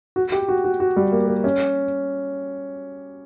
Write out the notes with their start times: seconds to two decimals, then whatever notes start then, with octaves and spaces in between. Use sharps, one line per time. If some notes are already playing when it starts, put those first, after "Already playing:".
0.16 F#4
0.32 G4
0.49 F#4
0.64 F#4
0.80 F#4
0.96 G3
1.12 A#3
1.28 A#3
1.44 C#4